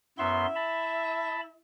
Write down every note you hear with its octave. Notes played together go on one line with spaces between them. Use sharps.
F#2 B3 E4 E5 C6
A5 B5